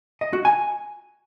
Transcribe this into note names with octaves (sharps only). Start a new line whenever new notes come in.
D#5
F#4
G#5